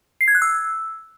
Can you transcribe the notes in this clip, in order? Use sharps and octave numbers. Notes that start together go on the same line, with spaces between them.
C7
G#6
F#6
E6